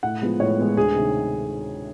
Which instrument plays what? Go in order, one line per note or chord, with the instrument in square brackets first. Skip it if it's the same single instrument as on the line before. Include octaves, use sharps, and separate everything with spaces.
[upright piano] A2 F#5
F3 G#3 B3
A2 C#5
F3 G#3 B3
D2 G#4
C3 D#3